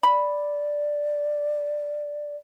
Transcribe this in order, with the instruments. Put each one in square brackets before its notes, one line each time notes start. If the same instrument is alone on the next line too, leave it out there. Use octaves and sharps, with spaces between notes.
[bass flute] D5 [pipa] B5